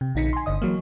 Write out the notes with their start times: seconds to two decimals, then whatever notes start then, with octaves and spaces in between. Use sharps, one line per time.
0.01 C3
0.15 A#1 D3 D#4 B6 C#7
0.33 G#5 C6
0.46 G1 D3 D#5 D#6
0.62 E3 F#3 A#3